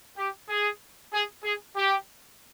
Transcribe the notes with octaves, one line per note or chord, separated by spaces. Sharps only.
G4
G#4
G#4
G#4
G4